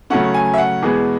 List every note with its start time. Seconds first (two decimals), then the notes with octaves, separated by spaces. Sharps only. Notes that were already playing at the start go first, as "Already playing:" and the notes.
0.10 C#3 F#3 A3 C#4 F#5
0.34 G#5
0.54 E5
0.58 F#5
0.82 E2 B2 G#3 B3 G#4